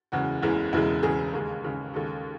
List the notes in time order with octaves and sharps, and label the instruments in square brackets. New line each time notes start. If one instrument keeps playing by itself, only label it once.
[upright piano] F#1 E2 C#3 E3 G#3 F#4
F#1 E2 C#3 E3 G#3
E1 E2 C#3 G#3 E4
E1 E2 C#3 G#3 G#4
D#2 C#3 G#3
D#2 C#3 G#3
D#2 C#3 G#3 A4